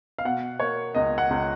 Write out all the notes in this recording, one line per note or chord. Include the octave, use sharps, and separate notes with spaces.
F5
B2 F#5
A#3 C#5
C#2 D#5
F#5
C#2